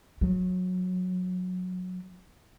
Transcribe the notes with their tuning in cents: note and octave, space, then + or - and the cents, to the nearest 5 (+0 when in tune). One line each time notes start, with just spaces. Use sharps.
F#3 -20